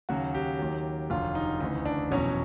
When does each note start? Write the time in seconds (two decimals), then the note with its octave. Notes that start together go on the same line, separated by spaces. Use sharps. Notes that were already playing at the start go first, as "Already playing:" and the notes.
0.09 D#2 C#3 F#3 F#4
0.34 G4
0.59 D#2 D#3 F#3
1.10 F1 D#2 D3 F#3 F4
1.35 D#4
1.60 D2 C#3 E3 D#4
1.86 D4
2.11 F1 E2 B2 F#3 C#4